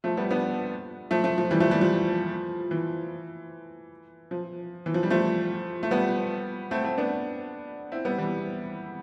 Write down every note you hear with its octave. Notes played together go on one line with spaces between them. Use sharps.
F3 A3
G3 B3
B3 D4
F3 A3
F3 A3
F3
E3 G3
F3 A3
E3 G3
F3
E3
F3
E3
F3
G3
F3 A3
A3
G3 B3
A3 C4
A3 C4
B3 D4
C4 E4
G3 B3
E3 G3